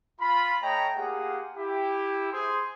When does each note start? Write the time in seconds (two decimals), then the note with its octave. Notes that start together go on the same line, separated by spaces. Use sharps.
0.19 F4 B5
0.62 A3 C#5 D#5 G5 A#5
0.95 A#3 F4 G4 G#4 F#5
1.56 E4 G4
2.31 G#4 C5 C6